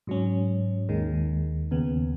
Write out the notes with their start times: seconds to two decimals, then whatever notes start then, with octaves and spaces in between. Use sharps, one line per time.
0.07 G#2 F#3 C#4
0.89 D#2 D#3 G#3
1.71 D#2 C#3 B3